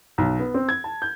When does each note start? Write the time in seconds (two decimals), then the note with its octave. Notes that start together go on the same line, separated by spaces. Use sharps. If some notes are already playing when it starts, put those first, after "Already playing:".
0.18 B1
0.39 B3
0.54 C4
0.69 G#6
0.84 A5
1.02 G6